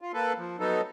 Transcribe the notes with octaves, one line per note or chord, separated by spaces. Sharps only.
F4
A#3 A4 B4
F3
F#3 B3 D#4 A4